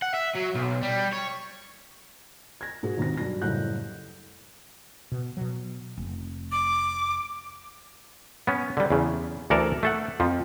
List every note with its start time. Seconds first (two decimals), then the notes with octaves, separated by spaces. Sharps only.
0.02 F#5
0.14 E5
0.35 F#3
0.55 B1
0.83 G3
1.13 C#5
2.61 G#6 A#6
2.83 G#2 F#4 G#4
2.98 D#2 G#2 D#3 C4 A#6
3.17 G2 F#3 A#6
3.42 F#1 A2 G3 F#5 F#6 G6
5.12 B2
5.37 B2 F#3
5.97 F1
6.52 D6
8.47 B3 C#4
8.77 D3 G3
8.90 E2 C#3
9.50 D2 E3 A4 A#4 D5 A5
9.83 A3 A4 F#5
10.20 F2 F3